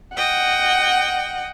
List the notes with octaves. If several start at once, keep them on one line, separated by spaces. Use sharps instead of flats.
D#5 F#5 G5